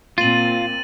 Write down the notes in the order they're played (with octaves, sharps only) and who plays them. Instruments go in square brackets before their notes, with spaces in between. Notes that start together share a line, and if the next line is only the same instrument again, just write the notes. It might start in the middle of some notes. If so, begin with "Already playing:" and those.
[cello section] A#2 A#3 C4 [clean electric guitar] F4 [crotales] A6 D#7 F#7